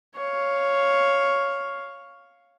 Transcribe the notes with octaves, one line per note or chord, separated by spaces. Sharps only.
C#5 F5